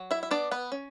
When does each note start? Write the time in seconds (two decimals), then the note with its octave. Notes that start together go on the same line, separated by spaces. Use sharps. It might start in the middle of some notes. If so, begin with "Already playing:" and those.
Already playing: F#3
0.11 E4 E5
0.23 E5
0.31 B3 D4 D5
0.51 B3 B4
0.72 C#4